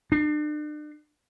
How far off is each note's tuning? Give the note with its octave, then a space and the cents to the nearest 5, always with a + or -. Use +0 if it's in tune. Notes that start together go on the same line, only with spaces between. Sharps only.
D4 +40